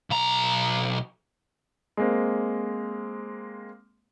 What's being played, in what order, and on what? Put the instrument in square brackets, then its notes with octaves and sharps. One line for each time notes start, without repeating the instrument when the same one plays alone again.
[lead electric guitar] B1 A#5
[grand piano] G#3 A#3 C4